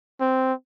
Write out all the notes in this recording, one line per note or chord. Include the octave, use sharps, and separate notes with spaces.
C4